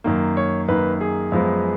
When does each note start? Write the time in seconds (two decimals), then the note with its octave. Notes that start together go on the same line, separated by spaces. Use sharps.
0.04 F#2 D#3 A#3
0.37 C#5
0.69 F#2 D#3 A#3 B4
1.01 G#4
1.32 F#2 F3 G#3 B3